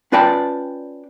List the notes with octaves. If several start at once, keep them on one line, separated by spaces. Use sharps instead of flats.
C#4 F4 B4 D5 G5 A5